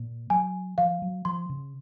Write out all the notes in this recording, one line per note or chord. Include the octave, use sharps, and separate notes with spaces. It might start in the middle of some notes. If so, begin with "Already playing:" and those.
Already playing: A#2
F#3 G#5
F3 F5
F#3
F3 C6
C#3